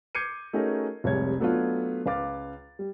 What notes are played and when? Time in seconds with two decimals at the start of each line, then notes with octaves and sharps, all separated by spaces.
0.15 D6 G6 G#6 C7 C#7 D#7
0.53 A3 C#4 D#4 F#4 G#4 A#4
1.04 F1 C2 G3 G#3 C#5 G#6
1.40 F#3 A3 B3 D4 F4
2.06 C#2 B4 F5 D6 A6
2.79 G3